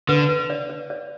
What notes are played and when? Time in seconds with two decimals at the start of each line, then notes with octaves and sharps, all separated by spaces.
0.09 D3 B4
0.29 B4
0.50 D5
0.70 D5
0.90 D5